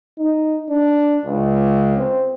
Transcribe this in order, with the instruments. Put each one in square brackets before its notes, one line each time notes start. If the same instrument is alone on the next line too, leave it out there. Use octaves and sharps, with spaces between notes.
[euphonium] D#4
D4
C#2
C4